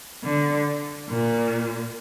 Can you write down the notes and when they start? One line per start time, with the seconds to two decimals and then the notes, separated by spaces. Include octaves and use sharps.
0.24 D3
1.08 A#2